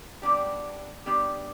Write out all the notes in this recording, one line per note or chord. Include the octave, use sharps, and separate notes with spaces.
G3 B3 D4 G4
G3 B3 D4 G4